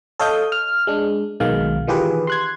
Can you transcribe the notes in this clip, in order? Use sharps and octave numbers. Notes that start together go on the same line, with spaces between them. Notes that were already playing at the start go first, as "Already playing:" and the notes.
A4 C#5 D#5 F5 D#6 G6
F6
G#3 D4
B1 B2 D#3 G#3 F5
D#3 E3 F4 G4 G#4 B4
C6 F#6 G#6